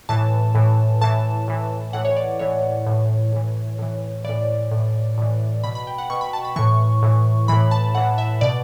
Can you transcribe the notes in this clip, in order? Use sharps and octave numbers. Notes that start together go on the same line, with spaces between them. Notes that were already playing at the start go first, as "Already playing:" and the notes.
A2 E3 A5
A2 E3
A2 E3 A5
A2 E3
A2 E3 F#5
C#5
D5
A2 E3 C#5
A2 E3
A2 E3
A2 E3
A2 E3 D5
A2 E3
A2 E3
B2 B5
B5
G5
F#5
B2 C#6
B5
A5
B5
A2 E3 C#6
A2 E3
A2 E3 B5
A5
A2 E3 F#5
E5
B2 D5